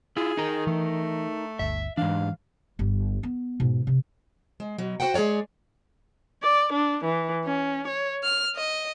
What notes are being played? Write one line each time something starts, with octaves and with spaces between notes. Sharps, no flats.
E4 F4 G#4
D#4 A#4
E3 A3
G1 D2 E5
G#2 E3 D4 F5
G1 G3
B3
G#2 B2
C3
G#3
B2 F#3
F#4 A4 C5 F#5 G5
G#3 G#4 A#4 C#5 D5
D5
D4
E3
C#4
C#5
F6
D#5